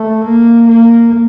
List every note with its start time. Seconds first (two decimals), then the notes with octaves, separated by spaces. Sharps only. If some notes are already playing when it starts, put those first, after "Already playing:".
Already playing: A3
0.24 A#3
0.67 A#3